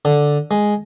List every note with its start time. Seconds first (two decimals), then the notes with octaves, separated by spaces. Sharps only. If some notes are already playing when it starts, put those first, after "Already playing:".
0.05 D3
0.51 G#3